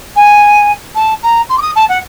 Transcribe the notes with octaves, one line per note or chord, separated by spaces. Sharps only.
G#5
A5
A#5
C6
D6
D#6
A5
F#5